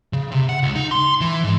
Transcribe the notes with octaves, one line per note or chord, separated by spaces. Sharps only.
C#3
C3
F#5
C#2
D#4
C6
E3
G#2